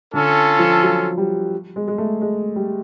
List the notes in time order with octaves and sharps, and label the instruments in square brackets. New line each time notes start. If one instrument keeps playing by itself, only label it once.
[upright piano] D3 [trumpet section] C#4 F4 A4
[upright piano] F3
F#3
G3
G#3
G#3
A3
G#3
G3